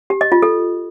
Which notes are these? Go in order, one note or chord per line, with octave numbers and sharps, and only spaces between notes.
G4
D#5
F4
A4